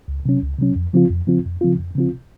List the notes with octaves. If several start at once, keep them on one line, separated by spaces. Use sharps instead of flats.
C#2
C3 F#3 C#4
C#2
C3 F#3 C#4
F2
C#3 F3 C4 F4
F2
C#3 F3 C4 F4
F2
C#3 F3 C4 F4
F2
C#3 F3 C4 F4